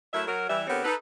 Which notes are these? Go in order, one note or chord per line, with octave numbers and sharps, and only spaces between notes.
F#3 A3 E4 A#4 E5
F#3 A#4
E3 G3 E5
D3 B3 C4 G4 A#4 C#5
D#4 A4 B4